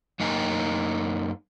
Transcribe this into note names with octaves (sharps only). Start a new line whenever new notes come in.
F#2 A#3 D#4 G#5